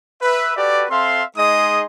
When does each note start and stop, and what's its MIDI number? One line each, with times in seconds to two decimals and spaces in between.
0.22 0.52 71
0.22 0.52 76
0.55 0.84 66
0.55 0.84 67
0.55 0.84 69
0.55 0.84 71
0.55 0.84 74
0.89 1.22 60
0.89 1.22 69
0.89 1.22 76
0.89 1.22 77
0.89 1.22 84
1.36 1.83 56
1.36 1.83 63
1.36 1.83 68
1.36 1.83 75
1.36 1.83 84
1.36 1.83 87